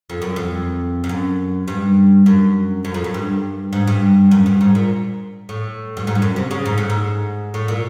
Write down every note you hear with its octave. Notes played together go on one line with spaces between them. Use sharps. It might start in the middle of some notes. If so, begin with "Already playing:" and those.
F2
F#2
F2
F2
F#2
G2
F#2
F#2
F2
F#2
G2
G#2
G2
F#2
G2
G#2
A#2
A2
G2
G#2
G2
F#2
C3
C#3
G#2
A2
G#2
A2
A#2